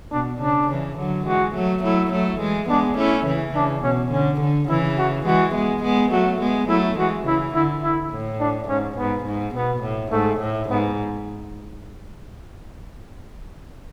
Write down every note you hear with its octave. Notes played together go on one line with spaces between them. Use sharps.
B2 D4
C#3 D4
C#3 E3
D3 F#3
E3 G#3 F#4
F#3 A3
F#3 A3 E4
F#3 A3
E3 G#3
G#3 B3 D4
A3 C#4 E4
C#3 E3
C#3 D4
B2 C#4
D3 C#4
D3
C#3 E3 E4
F#4
E3 G#3 F#4
G#3 B3
G#3 B3
F#3 A3 F#4
G#3 B3
F#3 A3 E4
E3 G#3 F#4
C#3 E3 E4
D3 E4
E4
A2
D4
G#2 C#4
G#2 B3
G#2
B2 B3
A2
G#2 A3
A2
G#2 B3